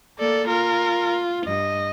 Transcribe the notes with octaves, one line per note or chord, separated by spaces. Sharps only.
A#3 A4 D5
F4 A#4
G2 D#5